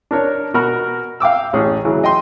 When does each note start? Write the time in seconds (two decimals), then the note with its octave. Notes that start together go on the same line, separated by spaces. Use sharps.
0.11 D4 A#4 C#5
0.54 B2 F#4 A#4 B5 F6
1.20 F5 G5 D6 E6
1.53 A1 A2 C#4 G#4
1.85 C#3 E3 F#3
2.04 D#5 G5 C6